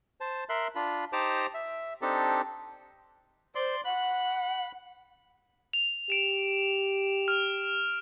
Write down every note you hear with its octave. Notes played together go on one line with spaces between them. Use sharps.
C5 A5
A#4 E5 C6 F#6
D4 F4 B5
D#4 G4 C5 A5 A#5 D6
E5
C4 D4 D#4 G4 A4
C5 D5 C6
F#5 B5 F#6
F7
G4 D7 E7
F6 F7